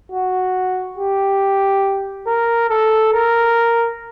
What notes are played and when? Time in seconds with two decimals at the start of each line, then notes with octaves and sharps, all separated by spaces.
0.12 F#4
0.98 G4
2.27 A#4
2.69 A4
3.13 A#4